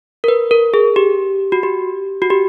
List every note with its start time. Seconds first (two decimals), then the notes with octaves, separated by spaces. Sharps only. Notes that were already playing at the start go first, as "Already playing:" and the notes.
0.24 A#4
0.28 B4
0.51 A#4
0.74 G#4
0.96 G4
1.52 F#4
1.63 G4
2.22 F#4
2.30 G4